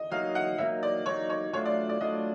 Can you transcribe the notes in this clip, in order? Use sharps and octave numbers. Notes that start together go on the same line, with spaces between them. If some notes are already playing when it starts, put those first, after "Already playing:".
Already playing: D#5
F#3 A#3 D#4 F5
F#5
F#3 A#3 D#4 E5
D5
F#3 A#3 D#4 C#5
C#5
F#3 A3 D4 F4 C#5
D5
D5
F#3 A3 D4 F4 D#5